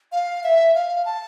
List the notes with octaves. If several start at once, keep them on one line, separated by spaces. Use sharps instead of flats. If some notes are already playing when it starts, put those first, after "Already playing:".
F5
E5
F5
A5